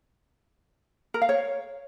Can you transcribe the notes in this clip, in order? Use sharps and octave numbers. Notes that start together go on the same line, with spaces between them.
A#4
F5
C#5